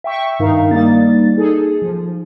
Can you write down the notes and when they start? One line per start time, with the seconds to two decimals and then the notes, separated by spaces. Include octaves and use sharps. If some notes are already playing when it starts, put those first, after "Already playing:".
0.04 E5 G5 C#6
0.39 G2 D#3 D#4 A#4 F5
0.71 G3 A#3 D#4 A6
1.37 D#4 G#4 A4
1.82 F3